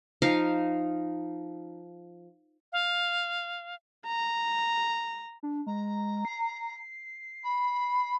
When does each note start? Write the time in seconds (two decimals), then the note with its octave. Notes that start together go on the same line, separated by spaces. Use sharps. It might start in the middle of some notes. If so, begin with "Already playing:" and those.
0.22 F3 D#4 F5
2.73 F5
4.07 A#5
5.43 D4
5.66 G#3 A#5
6.25 C7
7.43 B5